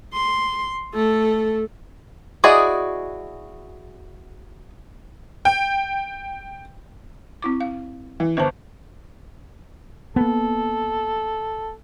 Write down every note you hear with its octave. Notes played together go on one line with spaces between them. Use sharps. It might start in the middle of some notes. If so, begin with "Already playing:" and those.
C6
A3 A4
E4 F#4 G#4 D5 D#5
G5
C4 E4 D6
F5
E3
G1 B4 C5 A5
A#3 B3 A4